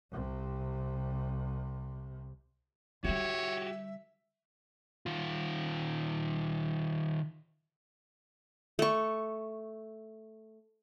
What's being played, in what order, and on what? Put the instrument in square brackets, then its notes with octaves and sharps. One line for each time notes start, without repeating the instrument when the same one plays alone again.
[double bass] C2 C3
[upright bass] D3 G3 [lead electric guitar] F#4 G4 [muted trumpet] C#5 [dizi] E5
[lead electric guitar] D#3 F4
[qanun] A3 C#6